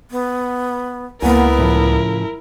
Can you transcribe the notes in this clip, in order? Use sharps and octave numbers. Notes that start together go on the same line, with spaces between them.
B3
C#2 A#3 B3 E4 A#4 F#5 G#5
A2 C#3 F3